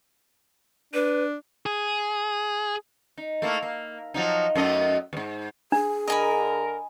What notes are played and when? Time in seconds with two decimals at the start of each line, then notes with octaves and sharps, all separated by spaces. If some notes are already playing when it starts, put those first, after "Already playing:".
0.94 D4 B4
1.66 G#4
3.17 D#4
3.42 A3 A#3 E4
3.62 A#3
4.14 F3 F#3 D#4
4.55 F#2 A3 D#5
5.13 E2 G#2
5.72 D4 G#4
6.08 D3 A#4 D#5 G#5 B5